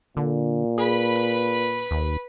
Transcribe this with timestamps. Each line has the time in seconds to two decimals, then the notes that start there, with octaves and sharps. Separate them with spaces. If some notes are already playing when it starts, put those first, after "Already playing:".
0.17 A#2 D3
0.78 G#4 B4 B5
1.91 D#2